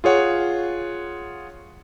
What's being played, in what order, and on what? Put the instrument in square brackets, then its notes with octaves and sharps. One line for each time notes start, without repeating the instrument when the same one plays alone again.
[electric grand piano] F4 G#4 C#5 F#5